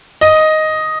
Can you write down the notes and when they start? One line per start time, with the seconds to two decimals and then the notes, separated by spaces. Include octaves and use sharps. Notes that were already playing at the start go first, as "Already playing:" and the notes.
0.21 D#5